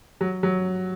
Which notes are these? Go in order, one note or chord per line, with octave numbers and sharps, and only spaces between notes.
F#3
F#3